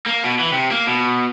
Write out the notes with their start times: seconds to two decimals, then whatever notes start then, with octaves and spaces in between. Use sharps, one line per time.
0.06 A#3
0.24 B2
0.39 E3
0.52 C3
0.71 A#3
0.86 B2